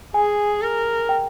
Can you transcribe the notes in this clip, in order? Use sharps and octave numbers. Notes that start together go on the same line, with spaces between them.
G#4 G#5
A#4
G5